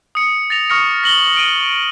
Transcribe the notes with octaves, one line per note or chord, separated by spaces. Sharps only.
D#6 C#7
A6 A#6 F7
C#6 D#6 F6 A#6 C#7
A#6 F#7 G7
D7 D#7